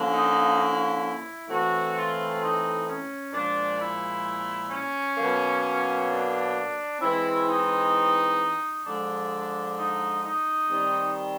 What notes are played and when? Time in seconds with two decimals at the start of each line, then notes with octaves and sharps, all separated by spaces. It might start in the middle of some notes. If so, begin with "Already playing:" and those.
Already playing: D3 F3 A#3 C#4
0.11 D#4
0.58 E4
1.49 A2 E3 A3 C4 F#4
1.95 F4
2.42 D#4
2.87 C#4
3.33 A#2 F3 G#3 D4
3.80 E4
4.71 C#4
5.17 B2 F#3 A#3
6.09 D4
7.01 E3 G#3 C4 E4
7.47 D#4
8.85 D3 F3 G#3 D4
9.77 D#4
10.23 D#4
10.70 D#3 G3 C4